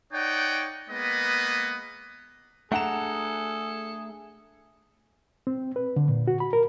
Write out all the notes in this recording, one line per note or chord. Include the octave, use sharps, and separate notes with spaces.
D#4 C#5 D5 F#5 G5
G#3 A#3 B3 B4 D#5
A3 D4 G#4 A4 F#5 A#5 E7
C4
B4
D3
A#2
F#4
B5
A#4